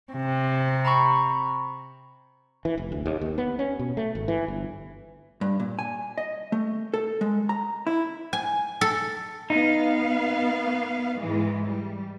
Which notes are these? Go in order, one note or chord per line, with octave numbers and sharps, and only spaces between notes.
C3
A#5 B5 C#6
E3
F1
D2
D#2
D#2
B3
C#4
B2
A3
G#1
E3
G1
G2
A#2
G#5
D#5
A3
A4
G#3
A#5
E4
G#5
A4
B3 D#4 F5
G#2 E3 G#3
G3